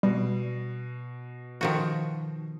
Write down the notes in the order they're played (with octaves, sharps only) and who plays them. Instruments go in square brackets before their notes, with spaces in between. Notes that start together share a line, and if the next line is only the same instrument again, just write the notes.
[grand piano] B2 [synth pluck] G3
[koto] D#3 F3 F#4